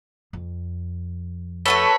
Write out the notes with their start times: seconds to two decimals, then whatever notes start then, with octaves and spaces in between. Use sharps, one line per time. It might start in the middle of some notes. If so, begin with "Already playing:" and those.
0.33 F2
1.66 A3 F#4 A4 B4 C#5 B5